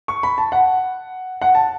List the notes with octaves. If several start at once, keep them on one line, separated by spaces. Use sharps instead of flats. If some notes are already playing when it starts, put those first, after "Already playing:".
C#6
B5
A5
F#5
F#5
A5